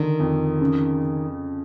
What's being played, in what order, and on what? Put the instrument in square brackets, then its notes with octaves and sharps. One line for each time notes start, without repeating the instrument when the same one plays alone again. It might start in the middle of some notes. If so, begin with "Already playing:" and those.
Already playing: [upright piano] D3 [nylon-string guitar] D#3
[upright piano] F2
C#3